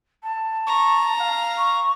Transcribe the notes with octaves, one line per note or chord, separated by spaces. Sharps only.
A5
A#5 C#6
F5
C#6